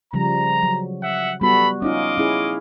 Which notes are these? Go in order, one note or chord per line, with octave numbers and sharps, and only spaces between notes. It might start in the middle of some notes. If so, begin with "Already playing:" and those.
C#3 F3 G3 A#5
F#3
E5 F#5
G3 B3 F#4 A4 B5
C#4 D#4 F4 D#5 F5 D6
C#4 E4 G#4